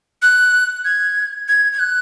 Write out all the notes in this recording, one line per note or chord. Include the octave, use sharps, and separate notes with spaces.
F#6
G#6
G#6
G#6
F#6